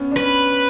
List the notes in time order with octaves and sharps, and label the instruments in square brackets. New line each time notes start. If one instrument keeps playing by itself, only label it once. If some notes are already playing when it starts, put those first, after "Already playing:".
Already playing: [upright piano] B3 C#4
D4
[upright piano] C#4 [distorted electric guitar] B4